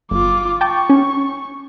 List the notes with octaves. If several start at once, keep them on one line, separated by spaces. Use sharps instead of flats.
G1 F4 D6
G5 A5 C#6 D6
C#4